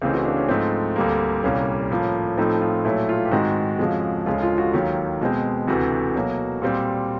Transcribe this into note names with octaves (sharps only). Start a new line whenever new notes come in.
C#2 C#3 E3 A3 C4 G4
F#4
D4
C#4
G#2 F3 A3 C4
D2 D3 G3 A#3
C2 A#2 G3 A#3 C#4
A2 F3 A#3
A2 F3 A3 C4 D#4
F4
A#2 F#3 A3 E4
F4
G4
G#2 D#3 G#3 C4 F#4
F2 C#3 F3 G#3
D2 C#3 F3 G#3 F4
F4
F#4
D#2 D#3 F#3 G4
B2 G#3 C4
D2 C3 E3 F#4
B2 F#3 A#3
A#2 G3 C4